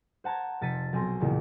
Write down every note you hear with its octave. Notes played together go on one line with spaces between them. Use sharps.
C5 F#5 A5 A#5 G#6
F1 C3 A6 B6 C#7 D#7
B1 C4 G#5 C6 A#6
A1 E2 A#2 C#3